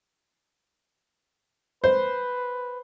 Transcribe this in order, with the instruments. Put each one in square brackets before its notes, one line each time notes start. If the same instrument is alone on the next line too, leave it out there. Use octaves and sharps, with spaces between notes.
[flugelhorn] B4 [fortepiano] C5